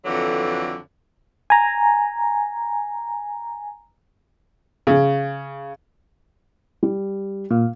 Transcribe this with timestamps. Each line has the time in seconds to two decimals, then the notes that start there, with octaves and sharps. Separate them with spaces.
0.05 F2 D3 E3 F#3
1.50 G#5 A#5
4.87 C#3
6.83 G3
7.51 A#2 F5